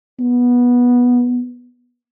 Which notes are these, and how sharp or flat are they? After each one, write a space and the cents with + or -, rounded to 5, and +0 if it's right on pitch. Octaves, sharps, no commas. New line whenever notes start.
B3 -15